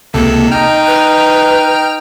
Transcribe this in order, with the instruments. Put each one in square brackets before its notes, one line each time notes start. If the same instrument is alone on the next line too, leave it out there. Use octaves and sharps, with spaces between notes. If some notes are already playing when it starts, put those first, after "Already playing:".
[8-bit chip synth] C#2 C3 A4 [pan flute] A#3
[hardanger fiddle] D#4 [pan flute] D#5 [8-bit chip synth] G5 F6
[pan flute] B4